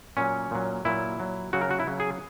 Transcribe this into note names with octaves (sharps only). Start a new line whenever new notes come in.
A#2 F#3 C#4
A#2 F#3
A#2 F#3 E4
A#2 F#3
C#3 F#3 F#4
A#4
F#4
E4
C#3 F#3
G#4